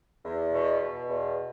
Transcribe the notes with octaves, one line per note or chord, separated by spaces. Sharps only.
E2
B2
B2
E2